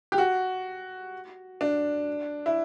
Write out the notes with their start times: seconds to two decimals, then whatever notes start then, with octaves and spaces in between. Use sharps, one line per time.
0.12 G4
0.18 F#4
1.61 D4
2.46 E4